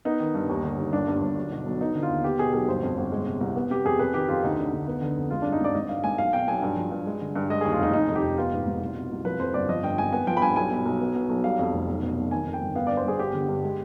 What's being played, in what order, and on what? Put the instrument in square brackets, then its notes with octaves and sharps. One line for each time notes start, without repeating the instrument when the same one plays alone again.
[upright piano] B3 D#4
D#3
G2
D#2
D3
D#2
G1 D4
G2
G1
B1
B2
B1
B3 D#4
D3
F4
D#2
B3 G4
B2 G#4
B1 G#4
G1 C5
F2
G1
G#3
C3
C2
B3
C3 G4
F2 G#4
F2 B4
D#3 G4
F2 F4
D2 D#4
D3
D2
B3
D3
F2
G#3 F4
G2 D4
D#4
G#1 D5
G#1 D#5
G2 F5
G#1 G#5
B1 F5
B2 G5
B1 G#5
G2
F3
G2
G#3
D3
G2
G#3 D#5
D#2 G#4
F4
F1 D#4
F1 D#4
F2
G4
F1
B3 F4
G#2
G#1
C2
B2
C2
F3 B4
F2 C5
G1 D5
F3 D#5
G2 G5
G#1 G#5
B3 G#5
F3 G5
B5
G2 G#5
B1 G#5
B2
B1
B3
B2
B1
G3 F5
F2
F1
B1
B2
B1
D#3 G#5
F2
G5
G1
B3 F5
G2 D5
C5
G1 G#4
B3 G4
D3
G2
G#3